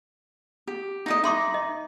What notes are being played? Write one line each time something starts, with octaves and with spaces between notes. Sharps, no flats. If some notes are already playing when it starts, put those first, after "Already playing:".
G4
D#4 E4 D#5
D#4 E5 C6 D6
D#5